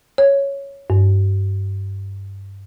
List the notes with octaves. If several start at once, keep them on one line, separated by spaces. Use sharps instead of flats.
C#5
G2